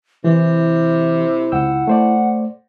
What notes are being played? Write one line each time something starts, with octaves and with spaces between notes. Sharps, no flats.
C3 E3 E4
C#2 F#5 G5 E6
A3 C5 D5